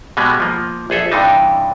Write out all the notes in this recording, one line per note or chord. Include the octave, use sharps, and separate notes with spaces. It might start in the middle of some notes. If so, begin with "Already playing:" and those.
B2 G3 G#3 B3
F3 A#3
A#1 G#4 A4 E5
G2 C3 E3 D4 D#4